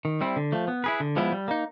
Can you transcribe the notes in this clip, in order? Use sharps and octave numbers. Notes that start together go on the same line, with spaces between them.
D#3
G3 C4 E4
D3
F3 A3
B3
E4 G#4 B4
D3
F3 G#3 B3 E4
G3
A#3 D#4